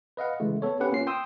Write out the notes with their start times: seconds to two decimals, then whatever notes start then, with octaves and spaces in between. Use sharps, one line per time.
0.17 B4 D#5 F5 F#5
0.40 C#3 E3 G#3 A3
0.62 B3 A4 C#5
0.80 B3 C#4 G4 B4 F#5
0.92 A#3 C#4 F4 C7
1.07 G5 C6 D#6 E6